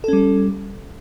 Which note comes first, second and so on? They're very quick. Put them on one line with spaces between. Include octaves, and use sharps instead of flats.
A4 C#4 G3